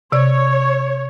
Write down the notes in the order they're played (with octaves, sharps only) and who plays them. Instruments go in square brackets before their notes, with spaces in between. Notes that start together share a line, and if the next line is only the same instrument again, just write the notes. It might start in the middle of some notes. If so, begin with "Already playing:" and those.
[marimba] C3 D5 [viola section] C#5